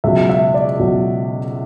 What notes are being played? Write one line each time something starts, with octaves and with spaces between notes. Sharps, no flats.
C#2 B2 F#3 E5
E5
D5
C#2 B2 F#3